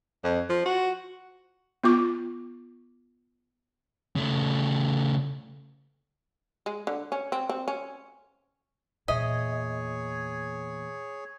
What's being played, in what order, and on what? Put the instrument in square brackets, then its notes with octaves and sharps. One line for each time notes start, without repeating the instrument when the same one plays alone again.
[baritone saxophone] F2
F3
F#4
[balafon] B3 F4 D6
[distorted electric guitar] C#3 A3
[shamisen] G#3
D3
C#4
C4
C4
C#4
[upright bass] E2 A#2 [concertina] G#4 C#5 [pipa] D#5 [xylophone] E5